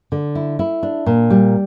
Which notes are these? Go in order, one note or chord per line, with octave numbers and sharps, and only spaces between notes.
D3
E4
E4
D4
A#2
G3